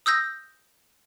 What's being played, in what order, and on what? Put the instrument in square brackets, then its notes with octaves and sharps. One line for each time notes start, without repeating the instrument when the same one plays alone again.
[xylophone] D#6 E6 G6 A#6